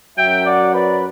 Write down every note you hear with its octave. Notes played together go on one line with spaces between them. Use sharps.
F#2 F#3 E5 G5
D5 F#5
B4 D5